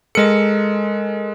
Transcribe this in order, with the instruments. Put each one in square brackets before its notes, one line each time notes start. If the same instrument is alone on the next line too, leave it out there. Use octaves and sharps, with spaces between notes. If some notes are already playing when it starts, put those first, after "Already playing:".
[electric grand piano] G#3 C#7 [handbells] A4 A#4 D#5